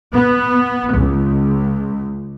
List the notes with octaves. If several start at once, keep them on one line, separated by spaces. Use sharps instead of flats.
B3
C#2